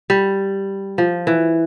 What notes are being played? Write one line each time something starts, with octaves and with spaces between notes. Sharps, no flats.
G3
F3
E3